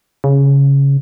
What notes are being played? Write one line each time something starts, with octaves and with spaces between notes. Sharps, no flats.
C#3